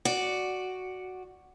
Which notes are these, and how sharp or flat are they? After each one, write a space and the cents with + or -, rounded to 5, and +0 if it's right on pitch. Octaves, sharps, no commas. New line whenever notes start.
F#4 +0 D5 +5